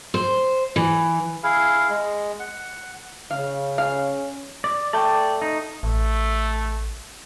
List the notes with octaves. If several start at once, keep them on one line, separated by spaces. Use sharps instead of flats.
C5
E3
E4 G#4 F5
G#3
F#5
C#3 F5
C#4 F5
D5
A3 D5 G5
D#4
A1 A3